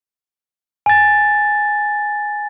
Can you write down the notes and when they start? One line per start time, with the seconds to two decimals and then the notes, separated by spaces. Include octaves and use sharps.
0.86 G#5 A6